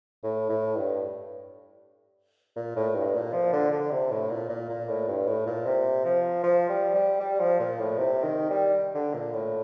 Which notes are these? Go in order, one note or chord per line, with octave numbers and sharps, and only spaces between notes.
A2
A2
G2
A#2
A2
G2
A#2
F3
D3
D3
C3
A2
A#2
A#2
A#2
A2
G2
A2
A#2
C3
F3
F3
G3
G3
G3
F3
A#2
A2
C3
D#3
G3
D3
A#2
A2